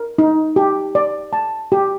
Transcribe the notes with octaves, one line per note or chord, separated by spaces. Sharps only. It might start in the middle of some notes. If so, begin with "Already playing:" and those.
Already playing: A#4
D#4
G4
D5
A5
G4